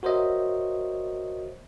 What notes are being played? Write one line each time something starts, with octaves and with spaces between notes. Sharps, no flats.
F#4 A#4 C5 C#5 D#5 E5